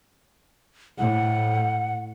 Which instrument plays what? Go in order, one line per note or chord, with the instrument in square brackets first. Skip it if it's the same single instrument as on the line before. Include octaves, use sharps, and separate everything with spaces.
[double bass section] A2 [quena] F#5